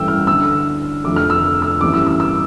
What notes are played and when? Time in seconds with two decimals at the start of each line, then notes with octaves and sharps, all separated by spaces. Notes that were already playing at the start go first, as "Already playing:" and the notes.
Already playing: A1 G2 E3 A3 C#4 G5 E6
0.08 F6
0.27 D2 D3 A3 E6
1.04 F1 F2 D3 A3 D6
1.16 F6
1.30 E6
1.62 E6
1.81 A1 G2 E3 G3 C#4 D6
1.94 E6
2.07 E6
2.20 E6